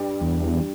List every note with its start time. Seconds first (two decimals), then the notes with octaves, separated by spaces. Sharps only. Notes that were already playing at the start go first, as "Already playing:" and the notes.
Already playing: G2 G3
0.21 E2